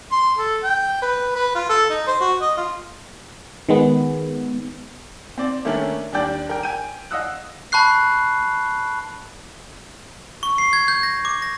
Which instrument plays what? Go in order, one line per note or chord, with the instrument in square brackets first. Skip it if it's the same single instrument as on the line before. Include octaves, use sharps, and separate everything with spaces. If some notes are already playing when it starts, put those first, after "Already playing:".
[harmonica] C6
A4
G5
B4
B4
F4
A4
D#4
C5
F#4
D#5
F4
[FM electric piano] D#3 G#3 B3
[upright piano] C4 D5
D#3 A3 A#3 C#4 D4
D#2 G3 D4 D5 G5
A#4 G5
G5 G#5 D#7
D#5 F5 F#5 D#6 E6 F#6
[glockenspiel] A5 B5 C#6 F#6 C7
C#6
C7
G#6
G6
A#6
D6
A#6